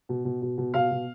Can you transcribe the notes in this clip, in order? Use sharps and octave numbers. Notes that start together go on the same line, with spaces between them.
B2
B2
B2
B2
B2 F5
B2